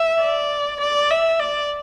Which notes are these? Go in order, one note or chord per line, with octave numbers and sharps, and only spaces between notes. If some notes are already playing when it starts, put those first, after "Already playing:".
Already playing: E5
D5
D5
E5
D5